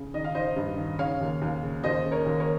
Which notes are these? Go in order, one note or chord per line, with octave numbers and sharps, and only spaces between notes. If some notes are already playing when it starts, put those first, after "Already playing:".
Already playing: C#3
D#3 D#5
F5
D#3 C5 D#5
G2
D#3
C#3 C#5 F5
D#2
D#2
C#3
D#2 C5 D#5
C#3
A#4 C#5
D#2
A#4 C#5